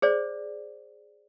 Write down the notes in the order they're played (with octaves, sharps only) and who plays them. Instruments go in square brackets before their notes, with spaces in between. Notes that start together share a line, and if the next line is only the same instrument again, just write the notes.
[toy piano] G#4 C5 D5